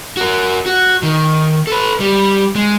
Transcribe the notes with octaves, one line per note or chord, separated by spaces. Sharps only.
F#4 A#4
F#4
D#3
A4 B4
G3
G#3